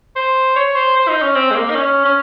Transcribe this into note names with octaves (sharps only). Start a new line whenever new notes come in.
C5
C#5
C5
C5
D#4
C#4
C4
G#3
A#3
D#4
C#4
C#4